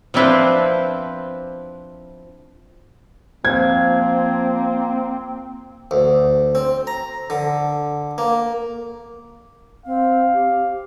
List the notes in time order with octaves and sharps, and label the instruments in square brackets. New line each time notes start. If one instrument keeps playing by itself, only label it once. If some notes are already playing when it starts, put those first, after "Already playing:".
[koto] F3 C4 D4 E4 B4 C5
[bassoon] F3 [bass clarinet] A#3 [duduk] C4 [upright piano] G#6
[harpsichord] D2
C4
A#5
D3
A#3
[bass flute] C4 [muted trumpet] F5
[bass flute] G4